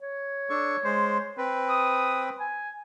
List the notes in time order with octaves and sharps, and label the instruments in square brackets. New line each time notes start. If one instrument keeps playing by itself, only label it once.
[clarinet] C#5
[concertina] D4 A4 C#6
G#3 C5
C4 B4
[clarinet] D#6
G#5